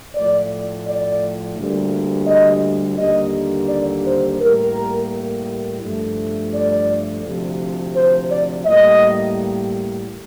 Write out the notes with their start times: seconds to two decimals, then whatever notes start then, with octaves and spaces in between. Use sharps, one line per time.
0.14 A2 F3 A3 D5
0.85 D5
1.56 D2 D3 G3 A#3
2.27 D#5
2.98 D#2 D3 G3 A#3 D#5
3.69 D5
4.05 C5
4.40 A2 G3 A#3 A#4
5.82 G2 F3 A3
6.53 D5
7.24 D2 C3 F3
7.95 C5
8.30 D5
8.65 A2 G3 A#3 D#5